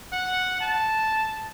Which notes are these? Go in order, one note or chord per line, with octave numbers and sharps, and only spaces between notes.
F#5
A5